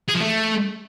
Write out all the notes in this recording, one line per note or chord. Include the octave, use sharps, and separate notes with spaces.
G#4
F3
A3